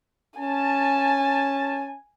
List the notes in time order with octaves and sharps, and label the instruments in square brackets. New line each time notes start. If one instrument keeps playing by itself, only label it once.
[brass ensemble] C#4 A5 [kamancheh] G#5